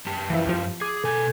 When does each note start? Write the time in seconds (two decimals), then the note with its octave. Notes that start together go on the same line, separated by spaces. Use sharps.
0.06 F#2 G4 A5
0.30 E3 F3 E4
0.47 F2 F3
0.81 G#4 D6 G#6
1.04 B2 A4 G#5 G#6